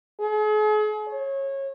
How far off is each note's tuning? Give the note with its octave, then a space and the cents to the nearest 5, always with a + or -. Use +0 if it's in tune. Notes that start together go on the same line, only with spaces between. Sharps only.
G#4 +40
C#5 -25